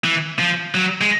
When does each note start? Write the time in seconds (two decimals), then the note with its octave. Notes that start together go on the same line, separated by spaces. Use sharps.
0.04 E3
0.39 F3
0.75 F#3
1.01 G#3